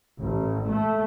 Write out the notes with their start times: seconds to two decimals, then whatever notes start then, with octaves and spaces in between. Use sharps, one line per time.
0.19 A1
0.69 A3